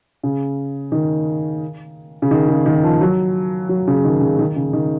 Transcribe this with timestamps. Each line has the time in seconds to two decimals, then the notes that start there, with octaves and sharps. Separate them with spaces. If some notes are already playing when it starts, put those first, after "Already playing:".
0.23 C#3
0.92 D#3
2.22 C#3
2.31 D#3
2.48 C#3
2.66 D#3
2.83 F3
3.01 F#3
3.69 F#3
3.87 C#3
4.05 D#3
4.21 C#3
4.39 D#3
4.56 C#3
4.73 D#3